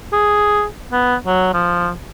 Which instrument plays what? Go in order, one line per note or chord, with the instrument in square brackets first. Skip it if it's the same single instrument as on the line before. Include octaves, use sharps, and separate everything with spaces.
[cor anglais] G#4
B3
F#3
F3